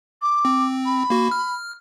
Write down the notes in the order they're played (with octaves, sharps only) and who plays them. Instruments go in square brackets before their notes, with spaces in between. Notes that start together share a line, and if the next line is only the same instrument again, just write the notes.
[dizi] D6
[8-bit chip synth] C4
[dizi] B5
[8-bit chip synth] A#3 F#4
F6